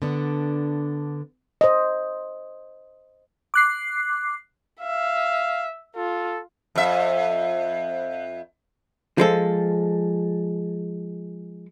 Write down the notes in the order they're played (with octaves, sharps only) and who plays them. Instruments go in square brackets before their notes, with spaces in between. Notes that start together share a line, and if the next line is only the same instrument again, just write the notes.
[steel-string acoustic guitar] D3 B3 D4
[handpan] C5 D#5
[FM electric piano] D6 F#6 C7
[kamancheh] E5 [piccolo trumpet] F5
[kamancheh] F4 [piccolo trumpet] A4
[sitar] F2 E5
[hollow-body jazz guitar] F3 G#3 A4